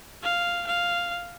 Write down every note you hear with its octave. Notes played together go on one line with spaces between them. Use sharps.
F5
F5